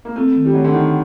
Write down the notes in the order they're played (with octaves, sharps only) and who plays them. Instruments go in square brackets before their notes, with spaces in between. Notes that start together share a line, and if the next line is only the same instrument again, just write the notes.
[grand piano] A#3
[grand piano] A3 [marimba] C4
[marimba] D#3
[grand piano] G3
[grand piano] F#3 [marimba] A3
[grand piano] D3
[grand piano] D#3 [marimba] G4